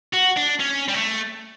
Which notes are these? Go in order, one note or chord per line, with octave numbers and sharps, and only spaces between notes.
F#4
D4
C#4
G3
A3